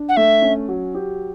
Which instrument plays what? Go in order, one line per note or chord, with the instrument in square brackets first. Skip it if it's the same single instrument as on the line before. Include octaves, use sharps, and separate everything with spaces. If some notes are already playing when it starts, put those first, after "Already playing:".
Already playing: [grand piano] D4
[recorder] F#5
[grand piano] A3 [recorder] E5
[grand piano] C#4
F#3
G4